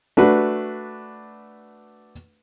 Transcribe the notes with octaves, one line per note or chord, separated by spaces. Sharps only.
A3 D4 F#4 B4